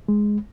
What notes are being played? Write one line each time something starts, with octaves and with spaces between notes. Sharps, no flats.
G#3